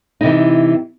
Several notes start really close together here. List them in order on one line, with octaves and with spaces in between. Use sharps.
D#4 C3 E3